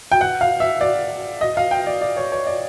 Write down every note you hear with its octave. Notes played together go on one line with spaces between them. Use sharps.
G5
F#5
F5
E5
D5
D#5
F5
G5
D5
D5
C#5
C#5
D5